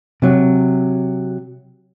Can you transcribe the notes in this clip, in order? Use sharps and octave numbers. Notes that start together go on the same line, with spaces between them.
C3 F#3